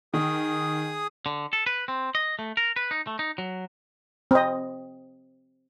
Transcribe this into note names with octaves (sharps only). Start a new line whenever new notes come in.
D#3 G#4 D#6
D3
A4
B4
C4
D#5
A3
A#4
B4
D#4
A3
D#4
F#3
C4 D#5